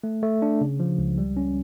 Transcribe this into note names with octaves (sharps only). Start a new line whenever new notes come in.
A3
A3
D4
C#3
F3
C#2
G3
C#4